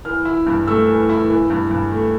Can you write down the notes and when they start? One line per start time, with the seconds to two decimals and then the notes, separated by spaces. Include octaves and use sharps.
0.05 E3 F6
0.25 E4
0.47 G2
0.67 A3 E6
0.88 E3
1.09 E4
1.30 E3
1.50 G2
1.71 G2
1.92 A3